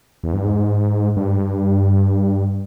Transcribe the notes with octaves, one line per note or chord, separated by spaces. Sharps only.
E2
G2
G#2
G2